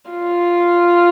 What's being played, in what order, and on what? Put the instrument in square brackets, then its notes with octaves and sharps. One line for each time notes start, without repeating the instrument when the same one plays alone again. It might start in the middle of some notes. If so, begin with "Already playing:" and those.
[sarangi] F4